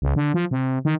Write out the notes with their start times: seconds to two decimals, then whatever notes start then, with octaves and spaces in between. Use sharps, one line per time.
0.02 C#2
0.16 D3
0.34 F3
0.51 C3
0.85 D#3